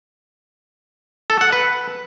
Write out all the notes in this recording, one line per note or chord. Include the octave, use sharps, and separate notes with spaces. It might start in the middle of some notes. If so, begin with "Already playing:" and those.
A4
F#5
B4